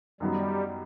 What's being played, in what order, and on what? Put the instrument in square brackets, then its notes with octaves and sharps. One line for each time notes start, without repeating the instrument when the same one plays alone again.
[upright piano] F#2 D#3 F#3 B3 [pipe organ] G3